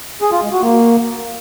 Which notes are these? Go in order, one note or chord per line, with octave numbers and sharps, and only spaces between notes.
G#4
F4
G#3
F#4
A#3